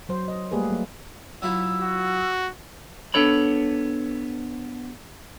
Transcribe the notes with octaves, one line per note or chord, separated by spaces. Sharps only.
F#3 C5
D#5
G3 A3 A#3 G4 G#4 B4
F#3 A#3
F#3 E4 F4 E6
F#4
B3 D4 A4 C#5 B5